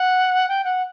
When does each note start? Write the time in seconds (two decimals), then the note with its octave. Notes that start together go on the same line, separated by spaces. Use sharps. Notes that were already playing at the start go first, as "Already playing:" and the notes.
Already playing: F#5
0.48 G5
0.64 F#5